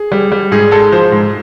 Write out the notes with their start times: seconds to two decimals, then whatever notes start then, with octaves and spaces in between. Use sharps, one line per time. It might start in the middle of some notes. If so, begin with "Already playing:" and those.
Already playing: G#4
0.12 G3
0.32 G3
0.51 G#2 G#4
0.71 G#3 A4
0.92 F3 C5
1.12 G#2